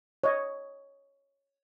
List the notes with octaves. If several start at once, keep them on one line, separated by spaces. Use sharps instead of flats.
C#5 D#5